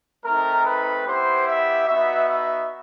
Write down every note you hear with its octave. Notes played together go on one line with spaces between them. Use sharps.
A3 C4 D#4 A#4
B4
B3 E4 G4 C5
E5
B3 D#4 F#4 E5
E5